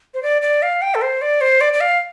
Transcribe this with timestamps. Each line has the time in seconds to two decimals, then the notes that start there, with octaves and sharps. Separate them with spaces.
0.14 C5
0.23 D5
0.42 D5
0.62 F5
0.82 G5
0.95 A4
1.02 C5
1.22 D5
1.41 C5
1.61 D5
1.73 D5
1.81 F5